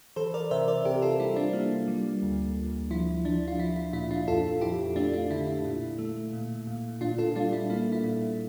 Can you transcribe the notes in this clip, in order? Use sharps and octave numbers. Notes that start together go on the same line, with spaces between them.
E3 A4 C5
A#4 D5
C3 C5 E5
A#4 D5
C3 G4 A#4
F4 A4
G3 E4
D4 F4
A#3
G3
D2
D2
F3 E4
F3 D4
F4
F3 E4
E4
A#2 E4
D4 F4
F2 F4 A4
F2 E4 G4
A3 D4 F4
D4 F4
D3 E4
E4
A#2
A3
A#2
A#2
A#2 D4 F4
F4 A4
G3 D4 F4
E4
A#3 E4
E4
A#2